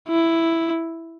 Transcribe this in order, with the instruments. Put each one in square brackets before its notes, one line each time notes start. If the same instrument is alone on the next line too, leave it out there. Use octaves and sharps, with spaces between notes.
[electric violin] E4